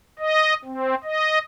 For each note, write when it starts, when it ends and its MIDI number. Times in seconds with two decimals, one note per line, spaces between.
0.19 0.54 75
0.64 0.95 60
1.03 1.38 75